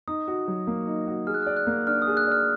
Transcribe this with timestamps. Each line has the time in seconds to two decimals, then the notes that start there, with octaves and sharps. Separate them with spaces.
0.08 D#4 D#6
0.28 F#4
0.48 F#3
0.67 A#3
0.87 D#4
1.07 F#4
1.27 G#4 F6
1.34 F#6
1.43 D5 F6
1.57 F#6
1.67 A#3
1.87 D4 F6
2.02 D#6
2.07 G#4
2.17 F#6
2.27 D5 F6